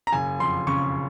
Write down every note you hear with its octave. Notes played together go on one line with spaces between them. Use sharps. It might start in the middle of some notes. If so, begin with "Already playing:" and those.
A#5
F#1 G#5
F2 C6
C#3 C#6